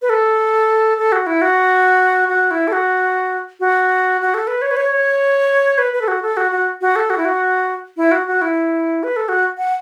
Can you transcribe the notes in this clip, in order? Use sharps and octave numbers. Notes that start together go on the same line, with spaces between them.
B4
A4
A4
F#4
E4
F#4
F#4
E4
A4
F#4
F#4
F#4
A4
B4
C#5
B4
C#5
C#5
B4
B4
A4
F#4
A4
F#4
F#4
F#4
A4
F#4
E4
F#4
E4
F#4
F#4
E4
B4
A4
F#4
F#5